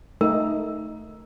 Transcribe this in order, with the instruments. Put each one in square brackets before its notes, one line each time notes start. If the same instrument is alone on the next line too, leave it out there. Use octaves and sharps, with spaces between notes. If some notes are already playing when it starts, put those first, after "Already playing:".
[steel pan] A3 D#4 [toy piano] A#4